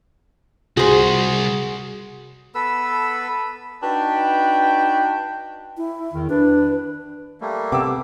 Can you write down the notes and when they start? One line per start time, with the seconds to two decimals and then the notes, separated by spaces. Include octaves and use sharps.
0.77 C2 F#4 G#4 C5
2.55 B3 A4 B4 E6
3.83 D4 D#4 F#4 B4 G5
5.77 E4
6.12 E2 D#3
6.29 D4 B4
7.41 G3 A3 A#3
7.72 C3 B3 G4 D6 E6